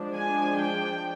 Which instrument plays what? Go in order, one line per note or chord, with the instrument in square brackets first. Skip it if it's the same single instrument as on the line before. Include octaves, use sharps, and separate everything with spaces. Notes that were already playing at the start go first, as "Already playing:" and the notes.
Already playing: [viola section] F3 G#3 D4
G#5
G5